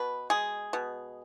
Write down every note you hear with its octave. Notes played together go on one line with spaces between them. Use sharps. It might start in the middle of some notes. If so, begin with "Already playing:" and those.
Already playing: B2 B4
G#3 G#4
B2